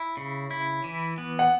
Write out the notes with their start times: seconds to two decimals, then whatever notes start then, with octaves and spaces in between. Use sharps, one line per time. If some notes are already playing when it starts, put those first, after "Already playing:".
Already playing: E4
0.17 C#3
0.51 E4
0.84 E3
1.18 B3
1.39 F#5